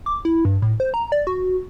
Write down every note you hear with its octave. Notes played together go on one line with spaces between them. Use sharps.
D6
E4
G2
A2
C5
A#5
D5
F#4